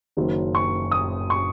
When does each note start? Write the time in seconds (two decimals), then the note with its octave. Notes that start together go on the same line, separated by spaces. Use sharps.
0.17 F#1 F#2 D#3 F#3
0.55 C#6
0.91 D#6
1.30 C#6